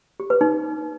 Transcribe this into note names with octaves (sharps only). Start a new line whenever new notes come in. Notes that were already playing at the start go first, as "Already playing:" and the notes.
G4
B4
D#4